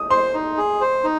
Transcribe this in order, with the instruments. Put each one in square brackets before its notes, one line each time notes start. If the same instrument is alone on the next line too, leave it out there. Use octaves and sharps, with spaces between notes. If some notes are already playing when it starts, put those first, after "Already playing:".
Already playing: [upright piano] D#6
[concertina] C5 [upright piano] C6
[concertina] D#4
G#4
C5
D#4